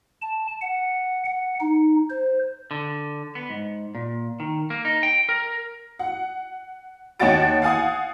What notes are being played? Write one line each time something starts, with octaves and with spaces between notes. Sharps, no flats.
A5
F#5
F#5
D#4
C5
D3
B3
G#2
A#2
D#3
A#3
D#4
G5
A#4
F#5
D#2 C#5 D#5 F#5 A6 D7
F5 F#5 G#5 D#6